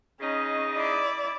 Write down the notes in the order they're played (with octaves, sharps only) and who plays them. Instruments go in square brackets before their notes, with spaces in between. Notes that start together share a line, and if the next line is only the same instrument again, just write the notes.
[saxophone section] C#3 D#4 D#5 [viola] C#4
[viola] E4 D5